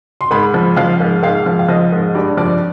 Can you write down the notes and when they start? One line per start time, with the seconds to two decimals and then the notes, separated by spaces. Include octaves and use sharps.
0.21 C6
0.31 G#2 B5
0.54 F3
0.77 F3 F5
1.00 G#2
1.23 G#2 F5
1.46 F3
1.59 F5
1.68 F3 D#5
1.92 G#2
2.15 G2 D5
2.37 F3 D5